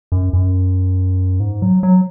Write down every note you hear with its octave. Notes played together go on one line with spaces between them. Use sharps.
F#2
F#2
G#2
F#3
F#3